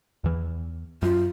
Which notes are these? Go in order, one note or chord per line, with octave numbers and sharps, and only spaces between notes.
E2 E3
F#2 F4